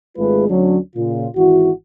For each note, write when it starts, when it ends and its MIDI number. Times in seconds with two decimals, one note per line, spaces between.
0.18 0.48 32
0.18 0.48 56
0.18 0.48 57
0.18 0.48 65
0.18 0.48 68
0.18 0.48 71
0.49 0.78 38
0.49 0.78 54
0.49 0.78 61
0.49 0.78 62
0.96 1.28 46
0.96 1.28 49
0.96 1.28 65
1.36 1.70 32
1.36 1.70 52
1.36 1.70 64
1.36 1.70 66